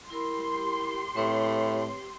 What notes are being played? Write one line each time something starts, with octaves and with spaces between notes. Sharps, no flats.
E4 G4 A#4 B5 C6
A2 C4 B4 C#5